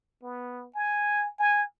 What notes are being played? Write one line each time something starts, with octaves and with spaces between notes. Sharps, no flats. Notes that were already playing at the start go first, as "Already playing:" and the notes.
B3
G#5
G#5